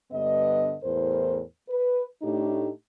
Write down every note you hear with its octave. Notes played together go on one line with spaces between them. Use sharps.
G2 D3 B3 D#5
E2 A2 A#4 C5
B4
A2 A3 D4 D#4 G4